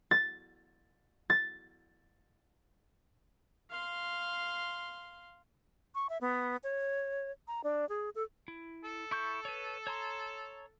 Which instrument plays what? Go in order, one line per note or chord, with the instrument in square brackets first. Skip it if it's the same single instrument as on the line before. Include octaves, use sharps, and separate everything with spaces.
[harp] A6
A6
[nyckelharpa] F5 C6
[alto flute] C#6
E5
B3
C#5
A#5
D4
G#4
A4
[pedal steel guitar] E4
[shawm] A4
[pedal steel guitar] E4 C#6 G6
B4 C#5
C#5 A#5 C6